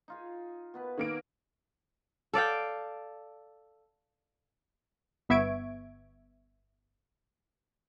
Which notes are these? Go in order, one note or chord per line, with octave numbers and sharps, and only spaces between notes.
D#4 F4 G#4
B2 B3 B4
D#3 A#3 G#4 D7
A4 D5 F5 G5
G1 B3 E5 C#6 G#6 D7